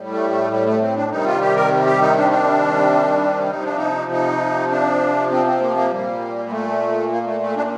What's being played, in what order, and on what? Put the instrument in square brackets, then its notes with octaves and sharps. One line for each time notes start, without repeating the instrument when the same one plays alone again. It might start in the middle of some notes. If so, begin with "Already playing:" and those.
Already playing: [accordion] A2 G3
A3
A3
G3
A3
C4
D4
C3 D#3 G3 D#4
F4
G4
A#4
G4
D#4
D4
D4
C3 F3 D#4
D4
D#4
D#4
D4
C4
C4
A#3
A#3
A#2 G3 A#3
G3
A3
A#3
A3
A3
D4